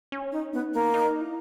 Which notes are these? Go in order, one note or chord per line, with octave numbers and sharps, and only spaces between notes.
C#4
D#4
B3 D#4
A#3
D#4
E4